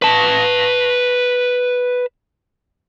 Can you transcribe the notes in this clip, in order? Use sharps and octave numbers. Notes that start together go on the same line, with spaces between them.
B4 A5